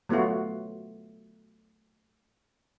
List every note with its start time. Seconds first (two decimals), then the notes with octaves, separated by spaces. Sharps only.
0.09 F#3 A3 B3 F4 F#4